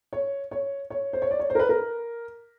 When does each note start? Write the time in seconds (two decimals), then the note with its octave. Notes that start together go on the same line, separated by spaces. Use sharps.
0.13 C#5
0.51 C#5
0.90 C#5
1.13 C5
1.22 C#5
1.31 D5
1.39 C#5
1.50 C5
1.55 A#4
1.59 B4
1.69 A#4